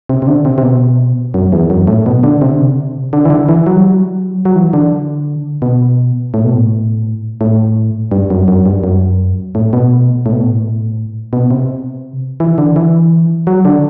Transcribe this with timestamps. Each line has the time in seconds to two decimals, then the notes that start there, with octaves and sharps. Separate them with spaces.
0.09 C3
0.22 C3
0.27 D3
0.45 C3
0.58 C3
0.63 B2
1.34 F#2
1.52 E2
1.70 F#2
1.87 A2
2.06 B2
2.23 D3
2.41 C3
2.51 D3
2.61 C3
3.13 D3
3.25 E3
3.30 D3
3.49 E3
3.66 F#3
3.77 G3
3.84 F#3
4.45 F#3
4.56 E3
4.73 D3
5.62 B2
6.34 A2
6.45 B2
6.55 A2
7.41 A2
8.12 G2
8.30 F#2
8.48 F#2
8.66 G2
8.84 F#2
9.55 A2
9.73 B2
10.26 A2
10.33 B2
10.41 A2
11.33 B2
11.51 C3
12.40 E3
12.58 D3
12.76 E3
13.47 F#3
13.65 D3